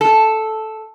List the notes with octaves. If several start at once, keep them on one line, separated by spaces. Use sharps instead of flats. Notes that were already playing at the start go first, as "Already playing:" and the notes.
A4